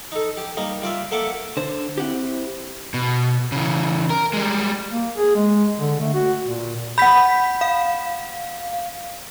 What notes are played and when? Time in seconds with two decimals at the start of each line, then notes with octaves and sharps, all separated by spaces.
0.12 D#4 A4
0.37 G4
0.57 G3 A#3 D#4
0.82 G3 F4 D5 E5
1.11 A#3 A4 E5 F#5 D6
1.57 D3 C5
1.98 C4 E4 G4 F#5
2.94 B2
3.52 C#3 E3
4.10 A#4
4.33 G3 G#3
4.90 A#3
5.16 G#4
5.36 G#3
5.80 D3
6.00 A3
6.14 F#4
6.43 A#2
6.98 F#5 B5 G6 B6
7.61 F5